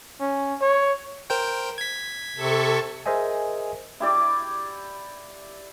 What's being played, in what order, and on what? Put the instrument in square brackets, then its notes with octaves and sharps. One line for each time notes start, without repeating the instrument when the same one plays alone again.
[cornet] C#4
C#5
[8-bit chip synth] A#4 C5 G5
G#6 B6
[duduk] C3 [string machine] A4 C#6
[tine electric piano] G#4 A#4 C5 D#5 E5 G#5
[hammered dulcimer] E4 G4 D5 D6